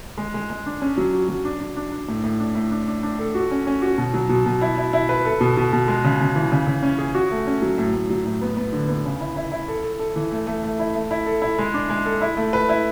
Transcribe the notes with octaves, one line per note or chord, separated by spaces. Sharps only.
G#3
G#3
G#3
D4
C#4
F#3
F#4
F#3
D4
D4
D4
D4
A2
A2
D4
A2
D4
D4
D4
A4
F#4
C#4
C#4
F#4
B2
F#3
B2
B2
E4
E4
E4
B4
A4
B2
B2
B2
G#3
C#3
C#3
E3
C#3
C#3
C#4
G#4
F#4
A3
C#4
F#3
A2
A2
F#3
A2
B3
B3
D3
B3
C#3
E4
E4
E4
A4
A4
A4
E3
A3
A3
A3
E4
A3
E4
A4
E4
G#3
D4
G#3
A4
E4
A3
B4
E4